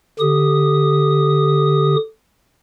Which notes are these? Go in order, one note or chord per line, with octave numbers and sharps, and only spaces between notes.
D3 G4 D#6